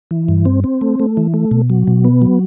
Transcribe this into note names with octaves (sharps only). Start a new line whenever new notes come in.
E3
G2
C4
C4
A3
A3
E3
A3
B2
F#3
B2
B3
F#3